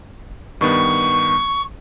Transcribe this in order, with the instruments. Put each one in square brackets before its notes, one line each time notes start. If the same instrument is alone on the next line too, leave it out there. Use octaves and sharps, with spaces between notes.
[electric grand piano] G2 D#3 B3 [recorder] C#6